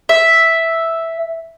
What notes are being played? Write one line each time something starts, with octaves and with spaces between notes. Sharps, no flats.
E5